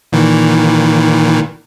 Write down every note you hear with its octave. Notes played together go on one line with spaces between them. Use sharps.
A#2 D#3 E3